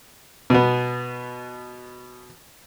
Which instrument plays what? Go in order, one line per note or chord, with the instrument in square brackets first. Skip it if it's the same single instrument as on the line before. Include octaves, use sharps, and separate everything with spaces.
[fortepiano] B2 B3